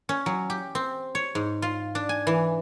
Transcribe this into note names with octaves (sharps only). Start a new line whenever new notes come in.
C#4
F#3
G4
C4
C#5
G#2
F4
D4
G#5
E3